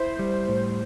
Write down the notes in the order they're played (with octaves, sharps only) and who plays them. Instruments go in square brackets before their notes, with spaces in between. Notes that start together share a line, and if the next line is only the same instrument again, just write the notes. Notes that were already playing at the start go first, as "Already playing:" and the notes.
Already playing: [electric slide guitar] E4 [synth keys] C5
[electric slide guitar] G3
A2